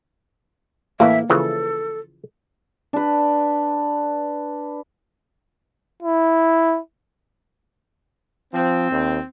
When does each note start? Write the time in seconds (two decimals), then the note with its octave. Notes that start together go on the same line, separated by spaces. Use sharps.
1.00 A2 E3 A#3 E5
1.30 C#3 E3 F3 A4
2.93 D4 B4
6.03 E4
8.54 F3 C4
8.91 D#2